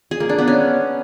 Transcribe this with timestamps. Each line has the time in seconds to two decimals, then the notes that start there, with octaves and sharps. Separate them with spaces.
0.11 G#4
0.20 A#3
0.29 D4
0.38 B3
0.48 C#4